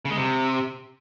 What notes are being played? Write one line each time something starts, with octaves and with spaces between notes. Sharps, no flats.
C#3
G#3
C3